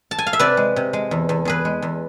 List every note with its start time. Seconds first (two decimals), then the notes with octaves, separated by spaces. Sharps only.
0.11 A5
0.18 G#5
0.26 F5
0.33 E5
0.39 C3 B4 D5
0.57 G#3
0.76 C3
0.93 G#3
1.11 E2
1.29 E2
1.45 E2 G#4 B4
1.65 G#3
1.82 E2